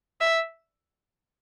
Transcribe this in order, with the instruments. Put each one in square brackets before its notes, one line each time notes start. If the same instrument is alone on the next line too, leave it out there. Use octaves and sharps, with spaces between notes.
[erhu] E5